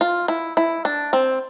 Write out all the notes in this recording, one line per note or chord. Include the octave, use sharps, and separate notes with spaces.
F4
E4
E4
D4
C4